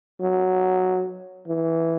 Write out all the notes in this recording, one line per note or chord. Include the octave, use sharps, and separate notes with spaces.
F#3
E3